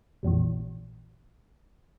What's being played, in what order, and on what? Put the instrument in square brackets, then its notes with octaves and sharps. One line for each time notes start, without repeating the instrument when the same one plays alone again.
[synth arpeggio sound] A#1 F2 A#2 E3